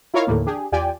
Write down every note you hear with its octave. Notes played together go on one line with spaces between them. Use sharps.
E4 F4 A#4 C#5 D#5 F5
D#2 A2 D3 E3 A3 A#3
D4 G4 G#4
E2 F4 G4 D5 G5 G#5